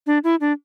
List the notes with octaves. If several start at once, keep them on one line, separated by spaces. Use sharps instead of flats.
D4
E4
D4